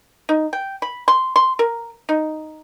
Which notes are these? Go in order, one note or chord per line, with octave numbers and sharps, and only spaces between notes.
D#4
G5
B5
C6
C6
A#4
D#4